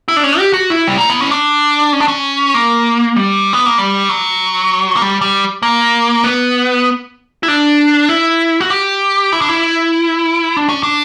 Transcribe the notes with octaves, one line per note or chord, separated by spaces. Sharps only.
E4
D4
C#4
G4
F#4
E4
G3
A#3
B3
C#4
D4
C#4
D4
C#4
A#3
G3
B3
A#3
G3
F#3
A#3
G3
G3
A#3
B3
E4
D4
E4
F#4
G4
E4
D4
E4
D4
C#4
D4